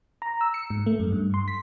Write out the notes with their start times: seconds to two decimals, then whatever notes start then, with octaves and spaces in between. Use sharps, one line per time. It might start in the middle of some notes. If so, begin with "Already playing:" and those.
0.22 A#5
0.41 E6
0.54 C#7
0.70 G#2
0.86 A3
1.00 F#2
1.12 G2
1.34 C6
1.48 B6